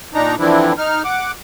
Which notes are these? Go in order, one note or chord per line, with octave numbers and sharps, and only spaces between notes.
A#2 D4 D#4 A#5
D3 E3 F3 C4 D4 E4
D#4 F6
F#5 D6